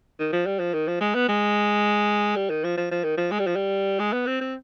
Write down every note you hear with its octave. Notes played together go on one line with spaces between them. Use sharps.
D#3
F3
G3
F3
D#3
F3
G#3
B3
G#3
G3
D#3
F3
F3
F3
D#3
F3
G#3
G3
F3
G3
G#3
B3
C4
C4